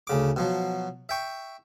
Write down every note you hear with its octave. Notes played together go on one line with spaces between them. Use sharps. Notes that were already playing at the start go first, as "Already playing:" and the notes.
D2 C#3 D6
B2 F3 F#3
E5 G5 C#6